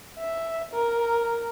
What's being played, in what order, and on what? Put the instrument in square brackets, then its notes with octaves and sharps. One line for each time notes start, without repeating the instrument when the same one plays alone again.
[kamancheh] E5
A#4